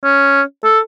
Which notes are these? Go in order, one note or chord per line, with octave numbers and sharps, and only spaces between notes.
C#4
A4